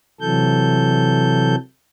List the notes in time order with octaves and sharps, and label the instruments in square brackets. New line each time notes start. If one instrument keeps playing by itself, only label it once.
[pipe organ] C3 E3 F#3 A4 G6